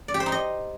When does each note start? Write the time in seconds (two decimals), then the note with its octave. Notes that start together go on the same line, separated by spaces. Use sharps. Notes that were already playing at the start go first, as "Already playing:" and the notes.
0.08 D5
0.14 G4
0.20 C5
0.26 D#4
0.32 D#5